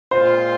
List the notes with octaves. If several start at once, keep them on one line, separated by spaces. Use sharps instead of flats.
A#2 G#3 C4 F4 C5